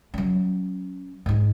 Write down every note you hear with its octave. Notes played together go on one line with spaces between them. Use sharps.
F#3 C#4
G#2 D#4